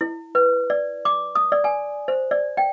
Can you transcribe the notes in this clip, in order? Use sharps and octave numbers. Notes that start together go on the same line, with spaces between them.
E4
B4
D5
D6
D#6
D5
G#5
C5
D5
G5